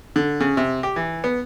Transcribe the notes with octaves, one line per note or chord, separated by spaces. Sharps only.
D3
C#3
C3
G4
E3
B3